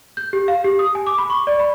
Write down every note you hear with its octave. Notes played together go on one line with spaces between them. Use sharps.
G6
G4
F5
G4
D#6
G#5
D6
B5
C#6
D5
B5